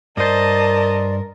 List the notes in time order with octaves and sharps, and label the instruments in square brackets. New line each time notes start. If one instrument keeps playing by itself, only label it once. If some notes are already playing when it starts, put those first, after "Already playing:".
[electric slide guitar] G2 C5 [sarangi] A#4 [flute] D5 [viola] D#5 A5